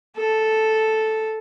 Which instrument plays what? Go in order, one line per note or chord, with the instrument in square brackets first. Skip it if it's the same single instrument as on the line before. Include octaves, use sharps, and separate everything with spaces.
[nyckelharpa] A4